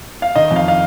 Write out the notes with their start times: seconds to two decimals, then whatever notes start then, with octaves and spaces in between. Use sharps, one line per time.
0.22 F5
0.35 D#3 D#5
0.51 F2
0.56 F5
0.68 F5